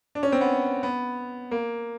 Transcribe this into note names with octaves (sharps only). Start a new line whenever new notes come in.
D4
C#4
C4
B3
B3
A#3